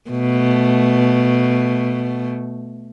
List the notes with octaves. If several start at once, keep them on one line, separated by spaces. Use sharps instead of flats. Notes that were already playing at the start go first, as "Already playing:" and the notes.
B2 A3